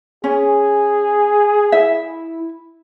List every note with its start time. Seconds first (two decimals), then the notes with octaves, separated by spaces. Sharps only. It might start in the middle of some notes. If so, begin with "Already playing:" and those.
0.24 C#4 G#4 G#5
1.72 E4 E5